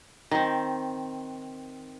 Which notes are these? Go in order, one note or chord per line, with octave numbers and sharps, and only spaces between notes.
D#3 C4